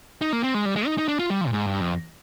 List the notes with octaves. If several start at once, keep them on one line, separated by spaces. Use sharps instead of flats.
D#4
A#3
C4
G#3
G3
G#3
D#4
D#4
D4
F4
G3
F3
A#2
G#2
G2
F2